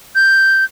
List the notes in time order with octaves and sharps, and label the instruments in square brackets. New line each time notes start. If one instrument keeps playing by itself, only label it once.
[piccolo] G6